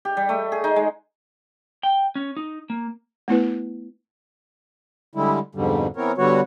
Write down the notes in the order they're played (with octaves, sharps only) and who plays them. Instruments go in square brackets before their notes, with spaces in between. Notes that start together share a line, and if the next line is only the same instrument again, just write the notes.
[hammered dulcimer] G4
G3
A3
G#4
D#4
G#3
[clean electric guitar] G5
C#4
D#4
A#3
[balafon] A3 B3 E4 B4
[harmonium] D3 G3 G#3 E4
F2 G#2 B2 D3 G3
E3 B3 C4 A#4 C#5
D3 G3 B3 F#4 C#5